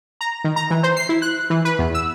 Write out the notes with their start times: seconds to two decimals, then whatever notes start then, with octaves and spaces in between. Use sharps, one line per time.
0.21 A#5
0.44 D#3
0.56 A#5
0.70 E3
0.83 C5
0.97 C7
1.09 E4
1.22 F#6
1.50 E3
1.65 B4
1.79 E2
1.94 E6